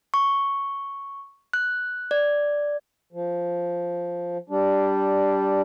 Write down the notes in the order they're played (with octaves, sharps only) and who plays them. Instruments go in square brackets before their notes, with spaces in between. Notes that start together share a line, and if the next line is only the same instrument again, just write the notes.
[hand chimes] C#6
F#6
D5
[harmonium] F3
G3 D4